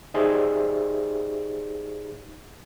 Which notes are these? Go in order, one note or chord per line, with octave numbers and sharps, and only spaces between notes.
D#4 G4 G#4 C5 D5 E5